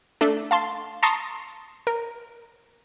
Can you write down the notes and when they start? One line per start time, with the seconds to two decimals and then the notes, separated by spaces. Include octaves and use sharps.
0.21 A3 D4
0.51 F5 A5 C6
1.03 A5 A#5 C6 C#6 D#6
1.87 A#4